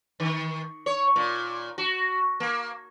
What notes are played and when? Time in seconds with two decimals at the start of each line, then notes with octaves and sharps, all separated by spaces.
0.20 D#3
0.86 C#5
1.16 A#2
1.78 F#4
2.40 A#3